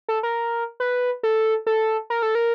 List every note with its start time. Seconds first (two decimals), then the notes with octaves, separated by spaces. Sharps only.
0.08 A4
0.23 A#4
0.80 B4
1.23 A4
1.67 A4
2.10 A#4
2.22 A4
2.35 A#4